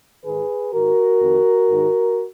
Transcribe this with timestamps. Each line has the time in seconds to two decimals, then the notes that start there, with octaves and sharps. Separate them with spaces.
0.24 G#2 D#3 G#4 B4
0.73 G#2 D#3 F#4 A#4
1.21 F2 D#3
1.69 G#2 D#3